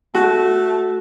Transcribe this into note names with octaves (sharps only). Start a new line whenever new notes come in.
A3 F#4